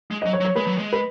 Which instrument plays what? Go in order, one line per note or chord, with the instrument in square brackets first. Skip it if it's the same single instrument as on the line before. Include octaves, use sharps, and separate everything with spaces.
[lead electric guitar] G#3
[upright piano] D#5
[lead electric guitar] F#3
[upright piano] C#5
[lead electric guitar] F#3
[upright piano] C#5
[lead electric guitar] G#3 [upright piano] B4
[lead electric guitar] F#3
G#3
[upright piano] B4